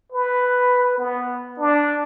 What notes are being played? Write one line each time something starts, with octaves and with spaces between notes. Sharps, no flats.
B4
B3
D4